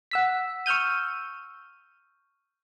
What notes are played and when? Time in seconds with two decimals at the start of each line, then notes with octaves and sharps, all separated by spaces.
0.11 F#5 E6 B6
0.66 C#6 E6 F6 G6 D#7